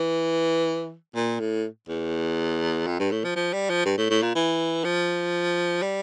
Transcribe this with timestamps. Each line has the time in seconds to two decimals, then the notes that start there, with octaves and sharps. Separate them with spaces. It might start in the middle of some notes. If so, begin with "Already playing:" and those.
Already playing: E3
1.15 A#2
1.40 A2
1.88 E2
2.87 F2
2.99 G2
3.11 A2
3.24 F3
3.36 F3
3.53 G3
3.69 F3
3.85 G2
3.97 A2
4.10 A2
4.22 A#2
4.35 E3
4.84 F3
5.82 G3